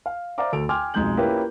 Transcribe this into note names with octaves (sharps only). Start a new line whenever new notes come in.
F5
C5 D5 E5 F5 A#5 D6
D2 A4 D7 F7
G5 G#5 C6 D6 F6
B1 F2 G#3 D#4 G6 F#7
A#3 C#4 E4 F4 G4 B4